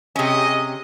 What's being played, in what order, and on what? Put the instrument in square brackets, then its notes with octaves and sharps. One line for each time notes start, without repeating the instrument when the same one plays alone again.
[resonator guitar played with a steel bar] C3 C#4 [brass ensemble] G4 G#4 D#5